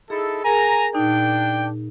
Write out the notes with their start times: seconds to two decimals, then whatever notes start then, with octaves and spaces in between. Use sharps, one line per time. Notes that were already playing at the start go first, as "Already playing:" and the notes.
0.10 D#4 E4 G#4 A4
0.44 G#4 A#4 G#5 A#5
0.95 A#2 D4 D#4 G5